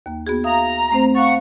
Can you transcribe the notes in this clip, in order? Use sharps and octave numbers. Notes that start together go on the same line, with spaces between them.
D#2 A#3
B3 F#4 G#4
E5 F5 A#5 D#6
A3 C4 C5
F5 F#5 C#6 A6